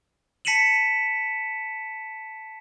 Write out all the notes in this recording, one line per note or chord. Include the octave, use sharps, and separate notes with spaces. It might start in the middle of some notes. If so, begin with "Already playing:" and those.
A5 B6 C#7 D#7 E7 F#7